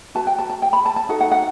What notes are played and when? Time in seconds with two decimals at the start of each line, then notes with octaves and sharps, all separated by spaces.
0.15 F#4 B4 A5
0.27 G5
0.39 A5
0.50 A5
0.62 G5
0.73 B5
0.86 A5
0.96 A5
1.09 D#4 F#4 A4 F#5
1.20 F#5
1.32 F#5